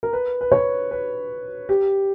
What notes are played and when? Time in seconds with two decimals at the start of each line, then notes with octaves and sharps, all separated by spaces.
0.03 A#4
0.13 B4
0.41 B4
0.52 C#5
0.91 B4
1.69 G4